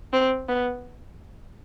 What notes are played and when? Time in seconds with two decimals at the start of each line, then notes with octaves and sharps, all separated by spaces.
0.13 C4
0.48 B3